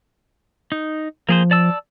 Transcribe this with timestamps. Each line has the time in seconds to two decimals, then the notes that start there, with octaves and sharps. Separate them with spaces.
0.72 D#4
1.29 F3 A#3 G#4 C5
1.51 D5 A5 E6